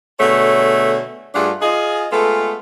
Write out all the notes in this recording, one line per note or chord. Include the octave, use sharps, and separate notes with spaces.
B2 D3 A3 G#4 C#5
G2 A3 D4 F4 G#4 F#5
F4 G#4 D#5
G#3 A3 B3 F4 A4